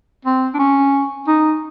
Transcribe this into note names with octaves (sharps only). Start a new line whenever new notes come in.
C4
D4
C#4
D#4